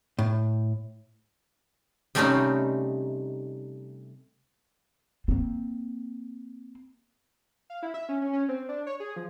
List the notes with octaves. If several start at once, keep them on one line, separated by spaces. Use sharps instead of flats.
A2
C3 G3 A3 C4 C#4 D#4
A#3 C4
F5
E4
E5
C#4
C#4
C#4
C4
D4
C#5
G#4
F3